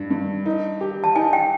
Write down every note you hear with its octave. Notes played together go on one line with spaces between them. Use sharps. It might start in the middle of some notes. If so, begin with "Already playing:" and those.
Already playing: G2
G2
D#4
G4
A5
D#4 G#5
G5